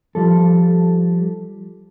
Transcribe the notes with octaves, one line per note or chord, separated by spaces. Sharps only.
F3 G3 A4